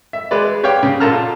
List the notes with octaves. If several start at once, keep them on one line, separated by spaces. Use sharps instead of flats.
E5
G#3 B4 D5
G4 C#5 F5 G5
C#3
A#2 F4 A4 A5 A#5 F6
F4